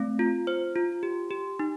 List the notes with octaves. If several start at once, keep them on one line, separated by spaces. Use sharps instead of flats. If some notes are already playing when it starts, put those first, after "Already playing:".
Already playing: A3 C4
F4
C5
F4
G4
G4
D#4